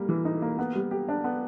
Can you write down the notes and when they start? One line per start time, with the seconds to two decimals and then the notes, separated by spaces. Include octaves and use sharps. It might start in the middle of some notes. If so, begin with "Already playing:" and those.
Already playing: G3 A#3
0.09 E3
0.25 D#4
0.42 A#3
0.59 B3
0.75 G3
0.91 G4
1.08 D4
1.24 B3